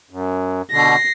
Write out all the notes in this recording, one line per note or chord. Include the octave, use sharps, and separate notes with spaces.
F#2
B2 D3 A#6 C7